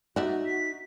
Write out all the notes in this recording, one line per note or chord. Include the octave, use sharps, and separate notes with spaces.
D#4 F#4 D5 E5 F#5
B6